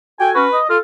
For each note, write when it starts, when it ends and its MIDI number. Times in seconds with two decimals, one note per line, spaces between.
0.20 0.31 66
0.20 0.31 69
0.20 0.30 79
0.20 0.31 80
0.35 0.47 61
0.35 0.47 66
0.35 0.58 71
0.53 0.66 75
0.70 0.77 65
0.70 0.78 69
0.70 0.78 77